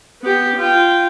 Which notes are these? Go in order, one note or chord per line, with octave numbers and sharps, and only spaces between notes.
B3 G4
F4 G5